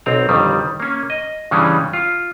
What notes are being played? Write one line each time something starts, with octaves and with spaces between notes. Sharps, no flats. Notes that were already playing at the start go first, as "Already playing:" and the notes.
B1 C4 A#5
G1 F2 D#3 G3
A#3 C#4
D#5
G2 C#3 E3 G3 G#3 C#4
F4